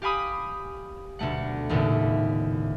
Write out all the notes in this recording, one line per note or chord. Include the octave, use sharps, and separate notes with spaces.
G4 F5 G#5 B5 D#6
D2 B2 A3 F#5
D#1 D#2 A2 C#3 B3 E5